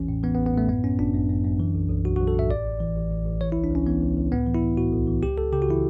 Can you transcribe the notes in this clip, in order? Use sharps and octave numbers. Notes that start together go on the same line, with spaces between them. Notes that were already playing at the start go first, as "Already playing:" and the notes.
Already playing: A1 E2 E3 C#4
A2
E3 B3
B3
A1
B3
A2 A3
F#2 B3
F#2 C#4
G1 D4
F#2
F#2
F#2
E3
B1
B1
B1 F#4
F#4
B1
A4
A2 E5
A1 D5
A1
E3
A1
A1
A1
E3 C#5
E4
C#2
D4
C#2 C#4
E3 B3
C#2
C#2
A2 B3
E3
E4
A2
A2 F#4
B1
E3
C#2 G4
C#2 A4
C#3 G4
F#4
E3 E4